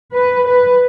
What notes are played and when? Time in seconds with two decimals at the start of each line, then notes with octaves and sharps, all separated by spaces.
0.13 B4
0.47 B4